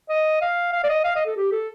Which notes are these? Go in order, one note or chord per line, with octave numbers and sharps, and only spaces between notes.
D#5
F5
F5
D5
D#5
F5
D#5
A4
G4
A4